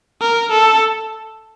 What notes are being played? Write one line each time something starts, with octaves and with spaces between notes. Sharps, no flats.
A#4
A4